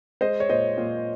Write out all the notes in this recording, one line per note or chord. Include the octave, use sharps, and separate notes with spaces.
G#3 C5 D#5
C#5
A#2 C5 D#5
A#2